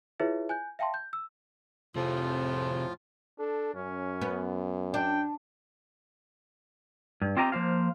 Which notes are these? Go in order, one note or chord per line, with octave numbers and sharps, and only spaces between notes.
E4 F4 G#4 B4 C#5 E5
G#5 F#6 G6
E5 F5 G5 A5 C6
G6
E6
F2 A2 C3 F3 C4 F4 G#4
D4 A4
F#2 C#4
B3
D4 G5
G2
C4 F4 G4 D#5 G#5 A#5
F3 A#3 C5 F5